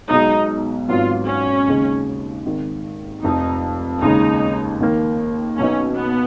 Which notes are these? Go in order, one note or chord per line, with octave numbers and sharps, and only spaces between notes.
B1 B2 G#3 D#4
G#1 G#2 F#3 B3 F4
C#4
D#2 C#3 G#3 D#4
G#1 G#2 D#3
F1 F2 F3 D#4
D#2 C#3 G#3 D#4
D#2 D#3 A#3
B1 B2 F#3 B3 C#4 D#4
B3